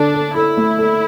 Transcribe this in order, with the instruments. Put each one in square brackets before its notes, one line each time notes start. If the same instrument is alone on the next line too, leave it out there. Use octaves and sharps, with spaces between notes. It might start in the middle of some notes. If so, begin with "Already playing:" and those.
Already playing: [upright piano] D3 A4 [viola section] D4
[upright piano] A4
[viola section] E4 [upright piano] A4
[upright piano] A3
A4